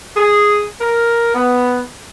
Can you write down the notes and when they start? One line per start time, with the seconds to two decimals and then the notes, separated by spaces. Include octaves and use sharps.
0.16 G#4
0.80 A#4
1.34 B3